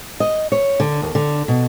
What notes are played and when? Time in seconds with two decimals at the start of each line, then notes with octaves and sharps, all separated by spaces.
0.20 D#5
0.52 C#5
0.80 D3
1.02 D#2
1.15 D3
1.48 B2